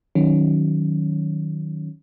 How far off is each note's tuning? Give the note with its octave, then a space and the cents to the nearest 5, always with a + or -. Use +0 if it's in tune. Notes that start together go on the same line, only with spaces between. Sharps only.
D#3 +0 F#3 +0 C#4 +0